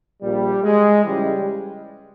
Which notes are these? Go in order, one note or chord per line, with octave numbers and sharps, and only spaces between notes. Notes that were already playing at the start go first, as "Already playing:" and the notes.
A#1 A#2 G3
G#3
C#2 C#3 E3 G3